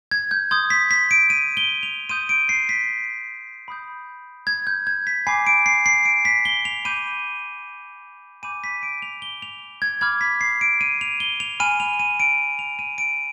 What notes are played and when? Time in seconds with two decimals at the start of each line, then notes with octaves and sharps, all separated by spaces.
0.11 G#6
0.31 G6
0.51 C6 D#6 G6 G#6
0.70 B6
0.91 B6
1.11 D7
1.30 D#7
1.57 G7
1.83 F7
2.09 C6 D#6 G6 D#7
2.29 D7
2.49 C7
2.69 B6
3.68 B5 D#6 G6
4.47 G#6
4.67 G6
4.87 G#6
5.07 B6
5.27 G#5 B5 D6 C7
5.47 D7
5.66 C7
5.86 C7
6.05 D7
6.25 B6
6.45 G7
6.65 F7
6.85 B5 D6 G6 D#7
8.43 G#5 B5 D6 G6 D#7
8.64 B6
8.83 D7
9.02 F7
9.22 G7
9.42 F7
9.82 G#6
10.01 B5 D6 F6 G#6
10.21 B6
10.41 C7
10.61 D7
10.81 D#7
11.01 F7
11.20 G7
11.40 F7
11.60 G#5 B5 F6 D#7
11.80 F7
11.99 D#7
12.20 D7
12.59 F7
12.79 D#7
12.98 D7